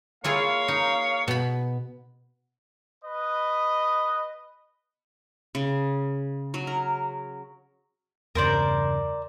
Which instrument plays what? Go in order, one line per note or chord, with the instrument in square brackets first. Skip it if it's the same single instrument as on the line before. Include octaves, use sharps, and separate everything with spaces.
[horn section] A#3 C#5 F5 [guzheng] E4 F4 G#4
[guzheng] D#4
B2 B5
[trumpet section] B4 D#5
[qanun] C#3
F#3
A#4
[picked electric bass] E2 G2 C#3 [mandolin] A#4 C5 D5